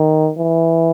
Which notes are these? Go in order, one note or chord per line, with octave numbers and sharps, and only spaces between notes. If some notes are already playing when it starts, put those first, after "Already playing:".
Already playing: D#3
E3